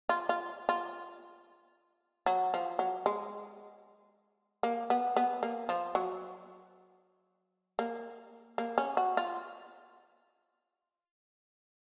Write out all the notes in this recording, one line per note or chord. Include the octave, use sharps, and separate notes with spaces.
F4
F4
F4
F#3
F3
F#3
G#3
A#3
B3
B3
A#3
F3
F#3
A#3
A#3
C#4
F#4
F4